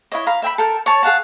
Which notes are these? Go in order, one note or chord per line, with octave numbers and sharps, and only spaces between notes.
E4 C#5 D#5
F5 A#5 B5
E5 G5 A#5 B5
A4 A#4 G5
C#5 A5 C#6
G#4 F5 F#5 A5